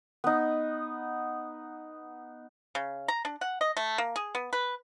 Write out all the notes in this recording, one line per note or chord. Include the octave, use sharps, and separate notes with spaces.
B3 D#4
C#3
A#5
D4
F#5
D#5
A3
A#3
G#4
B3
B4